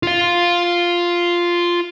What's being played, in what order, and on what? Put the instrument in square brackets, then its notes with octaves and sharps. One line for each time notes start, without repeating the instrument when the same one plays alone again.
[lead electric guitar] F4 F5